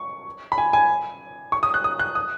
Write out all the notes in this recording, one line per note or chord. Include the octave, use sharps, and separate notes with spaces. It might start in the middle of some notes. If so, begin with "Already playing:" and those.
Already playing: C#6
B5
G#5
G#5
C#6
D#6
F#6
D#6
F#6
D#6